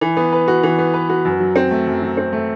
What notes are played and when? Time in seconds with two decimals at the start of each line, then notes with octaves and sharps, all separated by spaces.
0.01 E3
0.17 B3
0.33 B4
0.48 F#4
0.63 E3
0.78 B3
0.94 B4
1.10 F#4
1.25 F#2
1.40 F#3
1.56 C4
1.71 A3
1.87 F#2
2.02 F#3
2.17 C4
2.33 A3